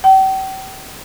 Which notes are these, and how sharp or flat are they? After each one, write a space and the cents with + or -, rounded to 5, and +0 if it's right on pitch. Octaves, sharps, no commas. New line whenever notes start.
G5 -40